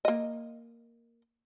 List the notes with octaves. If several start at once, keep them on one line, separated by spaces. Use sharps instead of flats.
A#3 D#5